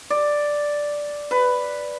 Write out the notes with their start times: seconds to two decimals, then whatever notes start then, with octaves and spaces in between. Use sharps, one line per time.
0.10 D5
1.31 B4